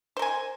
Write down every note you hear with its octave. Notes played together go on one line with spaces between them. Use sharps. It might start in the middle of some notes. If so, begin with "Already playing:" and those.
A#4 C5 G#5